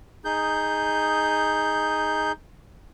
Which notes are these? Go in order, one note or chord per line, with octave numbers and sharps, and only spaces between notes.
D#4 G#4 G6